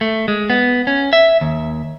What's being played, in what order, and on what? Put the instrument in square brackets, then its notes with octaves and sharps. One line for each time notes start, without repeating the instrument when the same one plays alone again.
[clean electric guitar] A3
G#3
B3
C#4
E5
D#2